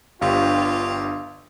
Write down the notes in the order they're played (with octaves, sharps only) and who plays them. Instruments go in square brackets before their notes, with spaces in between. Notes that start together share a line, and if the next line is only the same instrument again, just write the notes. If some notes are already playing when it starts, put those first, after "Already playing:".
[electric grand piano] G1 G2 [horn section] F4 G4 [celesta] F5